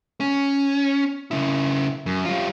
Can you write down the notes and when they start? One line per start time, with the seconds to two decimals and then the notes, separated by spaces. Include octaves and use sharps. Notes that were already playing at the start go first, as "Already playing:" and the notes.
0.20 C#4
1.31 C#3 E4
2.06 F#2
2.25 G3 F4